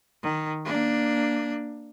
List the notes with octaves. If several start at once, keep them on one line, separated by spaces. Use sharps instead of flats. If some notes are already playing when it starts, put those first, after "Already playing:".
D#3
A#3 D4